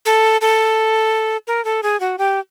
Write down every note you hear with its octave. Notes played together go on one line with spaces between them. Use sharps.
A4
A4
A#4
A4
G#4
F#4
G4